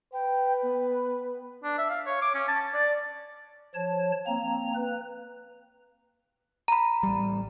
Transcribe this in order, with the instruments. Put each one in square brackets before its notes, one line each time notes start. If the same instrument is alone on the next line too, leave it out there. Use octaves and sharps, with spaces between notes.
[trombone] B4 [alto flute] G5
[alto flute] B3
[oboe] D4
E5
F5
C#5
D6
C#4
A5
D5
[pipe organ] F3 C#5 A5
A#3 C4 A#5
B4
[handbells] A#5 B5
[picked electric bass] A1 G3